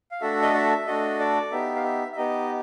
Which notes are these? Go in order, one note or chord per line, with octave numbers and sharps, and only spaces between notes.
F5
A3 D4 F#4 A4 E5
D#5
E5
A3 D4 F#4 A4 D#5
D5
B3 D#4 G4 E5
F5
E5
E5
B3 D#4 G4 D#5